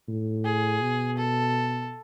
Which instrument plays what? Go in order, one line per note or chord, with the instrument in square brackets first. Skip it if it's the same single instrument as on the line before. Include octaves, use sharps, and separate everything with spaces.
[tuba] A2
[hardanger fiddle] G#4
[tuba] B2
[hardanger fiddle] A4